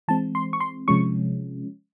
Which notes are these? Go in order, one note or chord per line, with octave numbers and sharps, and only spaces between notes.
E3 G#3 C4 A5
C6
C#6
C6
C3 F3 G#3 C#4 C#6